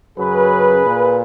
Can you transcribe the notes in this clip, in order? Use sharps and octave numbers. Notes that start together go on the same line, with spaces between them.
F#2 C#3 F#3 G#4 B4
A#2 A#3